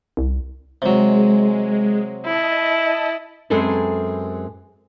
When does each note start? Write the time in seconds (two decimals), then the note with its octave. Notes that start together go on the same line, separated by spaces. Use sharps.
0.17 C2
0.82 C3 F#3 G#3
2.25 E4 D#5 A5
3.50 F#2 G#3 C4 G#4 A4 B4